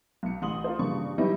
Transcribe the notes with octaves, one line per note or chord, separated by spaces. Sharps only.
B1 C#7
A1 C6 D#6 F#7
F4 A#4 C5
G2 A#2 C#3 E3 F3 C#6
E3 F#3 G3 B3 D#4 E4